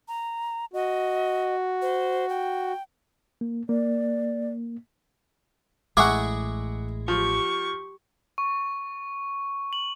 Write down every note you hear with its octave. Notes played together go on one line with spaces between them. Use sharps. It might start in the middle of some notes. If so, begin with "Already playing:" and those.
A#5
F#4 D#5
C5
G5
A#3
A#3 D5
A1 A2 G#3 E4 G#4 F#5 C#6 D6
F3 G4 C#6
C#6
F#7